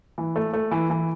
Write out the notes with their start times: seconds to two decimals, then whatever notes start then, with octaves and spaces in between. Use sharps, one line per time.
0.18 E3
0.36 A3
0.53 A3
0.71 E3
0.90 E3